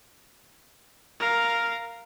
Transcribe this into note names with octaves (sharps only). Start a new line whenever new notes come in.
A#4 F5